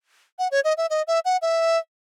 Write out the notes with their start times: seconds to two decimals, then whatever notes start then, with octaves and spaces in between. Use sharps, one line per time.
0.39 F#5
0.51 C#5
0.64 D#5
0.77 E5
0.90 D#5
1.07 E5
1.25 F#5
1.42 E5